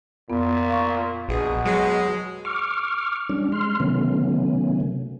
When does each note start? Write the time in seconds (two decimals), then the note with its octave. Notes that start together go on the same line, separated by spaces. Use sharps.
0.30 F2 A#2 B3
0.69 F5 C#6
1.29 A#1 B2 G#4
1.65 F#3 G#3
2.45 C#6 D6 F6
3.29 G3 C#4 D4
3.52 G#3 C6 F6
3.80 C3 D#3 F#3 A3 B3 C#4